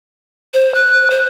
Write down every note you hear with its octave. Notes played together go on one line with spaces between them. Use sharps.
C5
F#6
C5